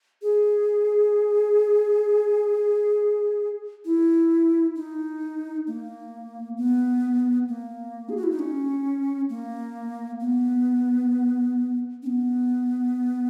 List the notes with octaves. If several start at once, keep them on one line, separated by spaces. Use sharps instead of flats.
G#4
E4
D#4
A#3
B3
A#3
G#4
F#4
E4
D#4
C#4
A#3
B3
C#4
B3